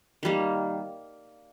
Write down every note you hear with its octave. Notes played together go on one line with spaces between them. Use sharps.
D#3 G3 A#3